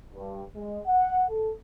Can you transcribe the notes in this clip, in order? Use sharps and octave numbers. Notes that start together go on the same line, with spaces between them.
G2
G#3
F#5
A4